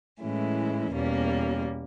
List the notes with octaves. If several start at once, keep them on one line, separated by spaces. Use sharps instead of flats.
A2 E3 G#3 C#4 E4
E2 B2 G3 A#3 C#4